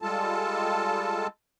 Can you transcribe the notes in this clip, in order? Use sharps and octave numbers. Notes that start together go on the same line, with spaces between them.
G3 G#3 F4 A4 A5